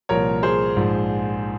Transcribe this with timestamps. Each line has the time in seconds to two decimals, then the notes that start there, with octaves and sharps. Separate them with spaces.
0.09 C2 A#2 F3 A#4 C#5
0.43 G#4 C5
0.76 A#1 G#2 F3